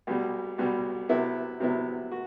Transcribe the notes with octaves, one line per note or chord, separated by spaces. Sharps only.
B1 B2 G3
B1 B2 G3
C3 F#3 B3 E4
C3 F#3 B3 E4
F#4